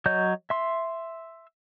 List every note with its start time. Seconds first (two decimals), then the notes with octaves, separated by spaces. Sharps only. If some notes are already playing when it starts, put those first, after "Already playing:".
0.06 F#3 C#5 D#5 G6
0.50 E5 C6